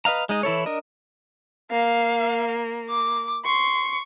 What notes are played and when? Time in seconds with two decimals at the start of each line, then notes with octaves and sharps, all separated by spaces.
0.05 B4 D#5 F5 A#5
0.29 G#3 D#4 D#5
0.43 E3 E4 A4 C#5
0.66 D4 A#4 D#5
1.71 A#3 F5
2.90 D6
3.45 C6 C#6